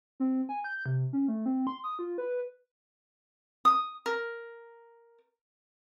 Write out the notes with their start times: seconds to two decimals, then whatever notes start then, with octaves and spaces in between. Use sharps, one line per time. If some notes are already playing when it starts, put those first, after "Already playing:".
0.20 C4
0.49 G#5
0.64 G6
0.86 C3
1.13 C#4
1.28 A3
1.46 C4
1.67 C6
1.84 D#6
1.99 F4
2.18 B4
3.65 D#6
4.06 A#4